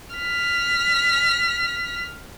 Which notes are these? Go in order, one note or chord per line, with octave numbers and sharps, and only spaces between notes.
F6 B6